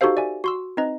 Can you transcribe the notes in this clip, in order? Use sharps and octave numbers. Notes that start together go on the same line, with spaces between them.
D#4 F#4 G4 A4 C5 F5
D5 E5 G#5
F#4 C6 E6
C4 D#4 B4 D#5 A#5